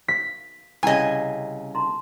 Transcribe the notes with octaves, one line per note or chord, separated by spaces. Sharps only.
F5 B6
C2 C#3 D#5 G5 G#5 A#5
D#4 A#5 C6